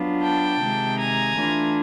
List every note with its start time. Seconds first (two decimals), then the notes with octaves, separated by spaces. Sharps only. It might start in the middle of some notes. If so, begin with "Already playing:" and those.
Already playing: F#3 B3 D4 F4
0.22 G5 A5
0.61 C3 D#3 G#3
0.99 G#5 A#5
1.38 E3 A3 D4 F4